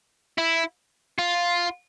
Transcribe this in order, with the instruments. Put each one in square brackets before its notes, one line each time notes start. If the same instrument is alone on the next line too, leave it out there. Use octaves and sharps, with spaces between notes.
[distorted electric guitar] E4
F4